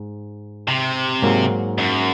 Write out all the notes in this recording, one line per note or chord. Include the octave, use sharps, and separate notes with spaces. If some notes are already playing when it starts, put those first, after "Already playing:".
Already playing: G#2
C3
G#2 F#3 A#3
F#2